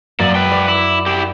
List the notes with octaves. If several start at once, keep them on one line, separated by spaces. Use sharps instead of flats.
F#2 A#3 D5
B4 G5
D5
E4 D6
E4 G4